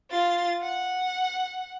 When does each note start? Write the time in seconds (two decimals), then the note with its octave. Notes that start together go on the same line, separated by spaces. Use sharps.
0.11 F4 A6
0.61 F#5